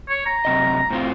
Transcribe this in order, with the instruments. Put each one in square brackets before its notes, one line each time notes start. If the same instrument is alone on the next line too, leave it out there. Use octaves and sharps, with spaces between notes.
[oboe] C#5
A#5
[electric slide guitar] F#2 C3 D#5
A2 C4 F4